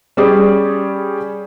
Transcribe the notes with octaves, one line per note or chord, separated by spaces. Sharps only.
G3 C#4 G4 G#4 D5